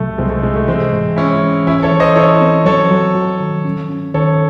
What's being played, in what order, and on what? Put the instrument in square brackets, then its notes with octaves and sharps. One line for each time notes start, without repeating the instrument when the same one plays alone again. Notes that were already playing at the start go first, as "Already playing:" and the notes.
Already playing: [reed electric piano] C2 C3 F#3 [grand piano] A3
[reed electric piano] C2 [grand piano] G#3 C4
[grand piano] A3
[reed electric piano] C3 [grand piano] G#3
[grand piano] A3
[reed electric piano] E3 [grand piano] G#3 C4
[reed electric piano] G#2
[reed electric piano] G#3 [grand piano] C#4 E4
[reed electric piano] E3
[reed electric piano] E3 [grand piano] C#4 E4
[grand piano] A4 C#5
[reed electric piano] E3
[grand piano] C5 D#5
[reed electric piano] E4 [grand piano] A4 C#5
[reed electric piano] C4
[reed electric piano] F#3 [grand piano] A4 C#5
[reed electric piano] F#3
F#3
D#3
C#4
C#4
[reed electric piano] D#3 [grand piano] A4 C#5